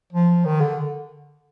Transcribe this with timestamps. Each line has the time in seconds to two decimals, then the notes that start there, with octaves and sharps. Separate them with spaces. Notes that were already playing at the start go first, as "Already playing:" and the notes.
0.13 F3
0.45 D#3
0.61 D3